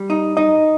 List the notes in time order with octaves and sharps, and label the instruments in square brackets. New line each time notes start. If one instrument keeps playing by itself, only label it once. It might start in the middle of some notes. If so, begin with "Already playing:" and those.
Already playing: [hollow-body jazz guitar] G3
D#4
[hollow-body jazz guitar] D#4 [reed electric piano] D#5